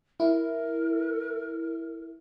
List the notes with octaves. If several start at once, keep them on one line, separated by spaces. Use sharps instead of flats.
E4 A#4